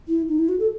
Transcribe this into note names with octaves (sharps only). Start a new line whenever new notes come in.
E4
D#4
E4
F#4
A4